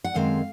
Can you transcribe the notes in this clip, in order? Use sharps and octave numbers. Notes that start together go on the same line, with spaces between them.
F#5
F#2 D#3 G#3 C4 F5